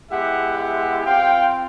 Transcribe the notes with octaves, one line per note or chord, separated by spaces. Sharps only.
G#3 B3 E4 G4 E5 F#5
E5 F#5
C4 F4 F5 G5